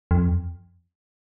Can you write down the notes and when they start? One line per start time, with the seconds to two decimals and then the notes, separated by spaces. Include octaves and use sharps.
0.11 F2